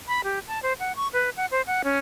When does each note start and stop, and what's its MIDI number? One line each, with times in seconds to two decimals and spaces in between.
0.08 0.21 83
0.24 0.39 67
0.48 0.62 81
0.63 0.73 72
0.80 0.96 78
0.96 1.08 85
1.13 1.30 71
1.37 1.46 78
1.51 1.62 72
1.67 1.82 78
1.84 1.99 61